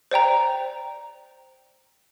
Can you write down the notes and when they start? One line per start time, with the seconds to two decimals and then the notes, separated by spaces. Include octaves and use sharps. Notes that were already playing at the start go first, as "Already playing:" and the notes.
0.11 C5 D5 G5 A#5